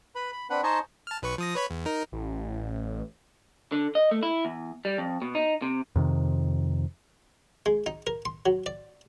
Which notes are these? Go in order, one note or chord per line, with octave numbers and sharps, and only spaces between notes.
B4 B5
B5
C4 D4 B4 F#5 B5
D#4 C5 D#5 G#5 A5 C#6
A5 F6
B1 B4 C#6
F3 D#6 A#6
B4 C#5 B5
E2
D#4 A#4
A1
D3
D#5
A3
E4
E2
G3
F2
B2
D#4
C3
F2 C3 D#3
G#3
D#4
A#4
C6
F#3
D5